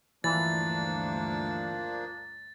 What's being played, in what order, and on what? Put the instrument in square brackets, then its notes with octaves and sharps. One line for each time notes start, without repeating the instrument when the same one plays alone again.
[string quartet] D2 G2 A5 [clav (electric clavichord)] E3 [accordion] F3 A#3 D4 [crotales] A6